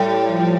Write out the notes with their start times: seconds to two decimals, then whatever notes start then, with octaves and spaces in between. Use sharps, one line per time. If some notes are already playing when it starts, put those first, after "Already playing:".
Already playing: A2 G3
0.27 F3